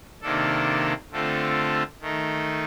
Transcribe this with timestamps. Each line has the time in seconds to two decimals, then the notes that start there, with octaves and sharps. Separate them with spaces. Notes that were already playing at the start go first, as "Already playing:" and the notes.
0.22 C3 D#3 A#3 D4 A4
1.11 D3 A3 C4 F4 A4
2.01 D#3 A3 D#4